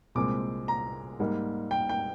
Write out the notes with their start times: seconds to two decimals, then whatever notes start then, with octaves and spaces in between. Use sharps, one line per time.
0.15 C2 A#2 G#3 C4 D6
0.68 A#5
1.20 G#2 G3 A#3
1.71 G5
1.89 G5